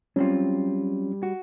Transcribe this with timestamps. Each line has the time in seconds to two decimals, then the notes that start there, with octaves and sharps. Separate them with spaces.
0.16 F#3 G3 C4 C#4 F4
1.23 F#4